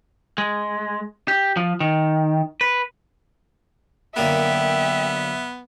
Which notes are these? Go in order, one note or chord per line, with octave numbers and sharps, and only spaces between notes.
G#3
G4
F3
D#3
B4
F#2 D3 A#3 B3 E5 G5